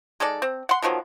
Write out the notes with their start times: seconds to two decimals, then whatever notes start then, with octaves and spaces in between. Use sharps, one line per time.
0.20 G#3 D#4 A4 D5
0.42 C4
0.69 F#5 C6
0.82 B2 D#3 F3 F#3